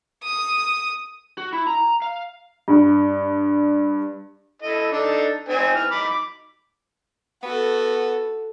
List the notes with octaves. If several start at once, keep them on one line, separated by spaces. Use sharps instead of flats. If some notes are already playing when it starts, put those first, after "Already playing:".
D#6
F#4
E4
A#5
F5
G2
E4 A4 D#5
D4 D#4 A4
C4 D#4 G#5
E3 F6
D#4 B5 D6
D6
B3 F#4 A4